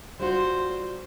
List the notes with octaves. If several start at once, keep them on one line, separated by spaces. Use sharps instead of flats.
G3 F4 F#4 C5